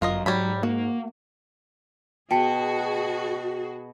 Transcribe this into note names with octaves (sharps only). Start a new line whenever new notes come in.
G1 F#2 F4 A#4 D#5
G#2 F#3 G3 C#5 B5
A#3 F#4
B2 F#4 G#4 G5 A5 C#7